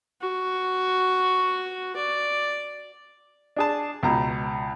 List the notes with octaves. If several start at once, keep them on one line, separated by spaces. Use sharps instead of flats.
F#4
D5
D4 G#4 A5
C#2 B2 A#5